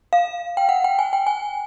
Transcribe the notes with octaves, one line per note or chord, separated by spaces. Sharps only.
F5
G5
F#5
G5
G#5
G5
G#5